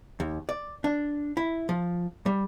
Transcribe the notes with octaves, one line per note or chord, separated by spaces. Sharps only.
D#2
D5
D4
E4
F3
G3